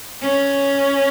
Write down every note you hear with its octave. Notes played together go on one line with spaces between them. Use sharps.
C#4